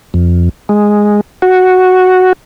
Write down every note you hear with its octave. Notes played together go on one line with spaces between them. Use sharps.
F2
G#3
F#4